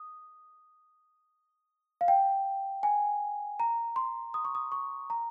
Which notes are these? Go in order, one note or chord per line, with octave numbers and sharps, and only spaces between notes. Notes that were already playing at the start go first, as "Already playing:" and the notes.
Already playing: D#6
F5
G5
G#5
A#5
C6
D#6
C#6
D#6
C#6
A#5